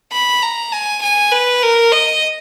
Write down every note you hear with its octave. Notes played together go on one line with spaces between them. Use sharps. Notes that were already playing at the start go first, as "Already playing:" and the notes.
B5
A#5
G#5
G#5
B4
A#4
D#5